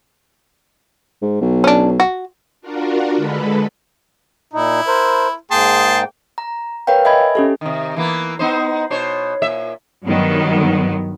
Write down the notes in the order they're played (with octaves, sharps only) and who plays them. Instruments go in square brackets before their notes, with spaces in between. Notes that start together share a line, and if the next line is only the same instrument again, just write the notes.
[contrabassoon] G#2
B1
[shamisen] C#4 D4
F#4
[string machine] D4 F4 F#4 A#4
D3 G#3 A4 B4 B5
[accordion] A#2 D#4 [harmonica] E4
[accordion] A#4 C5
[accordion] G#2 A#3 G5 [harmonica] G#4 A5 C6
[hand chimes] A#5
A#4 B4 C#5 F5 G5
D#5 E5 G#5 B5 G#6
C#4 G4 A4
[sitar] C3 D#3
E3 A#3 B3
B3 D#4 C5
B2 C5 C#5
A#2 E5
[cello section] G2 D#3 F#3 B3